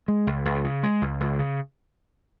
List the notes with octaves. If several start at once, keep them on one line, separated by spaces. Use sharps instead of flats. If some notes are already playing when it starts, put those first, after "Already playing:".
G#3
C#2
C#2
C#3
G#3
C#2
C#2
C#3